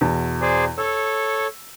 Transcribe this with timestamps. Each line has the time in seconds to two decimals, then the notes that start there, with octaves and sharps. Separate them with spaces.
0.01 E2 B2 A5
0.41 G#4 C5 D5
0.78 A4 C#5 E6